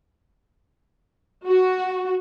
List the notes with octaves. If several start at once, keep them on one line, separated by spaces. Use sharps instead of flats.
F#4